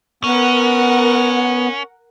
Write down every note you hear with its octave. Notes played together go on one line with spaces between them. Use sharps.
B3 C#4 A#4 F#5